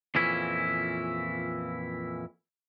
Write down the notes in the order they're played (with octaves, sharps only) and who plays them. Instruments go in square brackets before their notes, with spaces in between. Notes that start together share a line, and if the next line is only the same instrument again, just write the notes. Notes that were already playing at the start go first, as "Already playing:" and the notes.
[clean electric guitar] F2 A#2 E3 C#4 E4